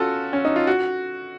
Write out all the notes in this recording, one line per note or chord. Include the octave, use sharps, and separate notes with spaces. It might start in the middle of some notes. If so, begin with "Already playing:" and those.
Already playing: C#4 F4 F#4 A4
C#4
D#4
F4
F#4